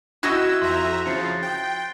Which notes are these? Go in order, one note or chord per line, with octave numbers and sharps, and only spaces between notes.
E4 F#4 D#5 E6 F#6 G6 A#6
F2 E5 A#5 C6 G6
C#3 F3 A6 C7 C#7
G5